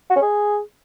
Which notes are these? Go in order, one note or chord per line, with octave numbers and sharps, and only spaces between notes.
F#4
C#4
G#4